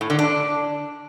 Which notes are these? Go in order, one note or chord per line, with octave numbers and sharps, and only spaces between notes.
A2
D3
D4